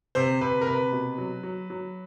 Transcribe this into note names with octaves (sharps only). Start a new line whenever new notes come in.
C3 C5
C3 B4
A#4
C3 B4
B2
F#3
F#3
F#3